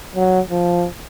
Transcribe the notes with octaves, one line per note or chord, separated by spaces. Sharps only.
F#3
F3